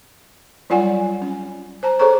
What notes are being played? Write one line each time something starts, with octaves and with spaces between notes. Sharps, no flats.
F#3 G3 F4 D5 F#5 G#5
C#4
C5 A5 A#5
G#4 A4 C5 C#5 A#5 C#6